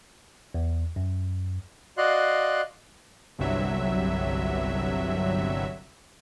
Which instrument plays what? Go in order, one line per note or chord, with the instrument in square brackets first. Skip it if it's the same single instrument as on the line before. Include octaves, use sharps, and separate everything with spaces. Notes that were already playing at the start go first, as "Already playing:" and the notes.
[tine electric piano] E2
F#2
[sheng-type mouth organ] F#4 D5 D#5 F5 C6 F#6
[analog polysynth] G1 C2 G2 C3 F#3 E5